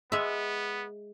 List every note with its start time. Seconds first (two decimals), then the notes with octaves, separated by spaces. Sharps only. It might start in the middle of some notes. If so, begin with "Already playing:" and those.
0.12 G#3 B3 E5